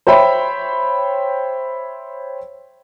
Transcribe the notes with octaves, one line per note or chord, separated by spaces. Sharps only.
C5 C#5 E5 G5 B5